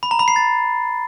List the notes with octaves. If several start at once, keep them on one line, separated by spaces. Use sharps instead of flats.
B5
A#5
B5
C7
A6